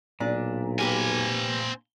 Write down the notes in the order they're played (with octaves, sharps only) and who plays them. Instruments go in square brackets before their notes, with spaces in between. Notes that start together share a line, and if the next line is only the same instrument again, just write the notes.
[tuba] B1 [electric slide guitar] A#2 [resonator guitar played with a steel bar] D4
[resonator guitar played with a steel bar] A#3 G4 B4 [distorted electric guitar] C4 G#5